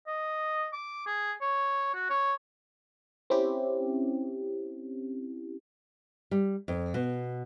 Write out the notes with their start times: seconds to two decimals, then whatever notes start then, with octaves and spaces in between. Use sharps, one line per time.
0.07 D#5
0.73 D6
1.07 G#4
1.41 C#5
1.94 F#4
2.10 C#5
3.30 C4 C#4 E4 G4
6.31 G3
6.68 F2
6.94 B2